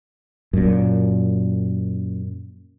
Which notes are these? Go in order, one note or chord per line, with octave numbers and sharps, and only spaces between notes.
F#2 A#2